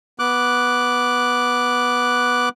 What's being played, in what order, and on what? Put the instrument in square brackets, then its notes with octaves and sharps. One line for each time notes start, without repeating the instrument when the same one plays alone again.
[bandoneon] B3 D6 F#6